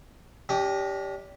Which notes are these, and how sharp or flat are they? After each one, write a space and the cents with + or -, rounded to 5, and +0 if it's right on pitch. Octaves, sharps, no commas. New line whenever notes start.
D4 -45 G4 +0 D#5 -5